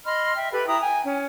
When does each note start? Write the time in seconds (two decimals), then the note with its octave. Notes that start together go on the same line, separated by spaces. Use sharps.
0.05 D#5 B5 C6 F6
0.36 E5 G5
0.52 G4 A4 B4 B5
0.67 E4 G5 A#5 D#6
0.81 G5 G#5
1.04 C#4